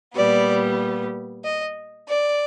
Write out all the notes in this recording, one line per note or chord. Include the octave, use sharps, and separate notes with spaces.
A#2 G3 B3 D5
D#5
D5